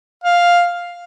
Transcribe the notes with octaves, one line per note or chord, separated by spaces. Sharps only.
F5